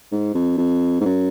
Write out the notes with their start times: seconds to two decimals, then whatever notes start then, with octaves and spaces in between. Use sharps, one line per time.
0.11 G#2
0.34 F2
0.57 F2
1.01 G#2
1.05 F#2